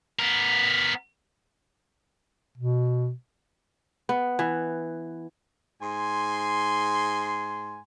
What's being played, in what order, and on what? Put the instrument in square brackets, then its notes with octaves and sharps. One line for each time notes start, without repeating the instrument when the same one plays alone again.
[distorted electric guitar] B3 A#4
[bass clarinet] B2
[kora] B3
E3
[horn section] G#2 G#5 C6